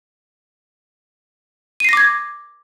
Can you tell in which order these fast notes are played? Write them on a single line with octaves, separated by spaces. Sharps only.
D#7 C7 A#6 D6 G#6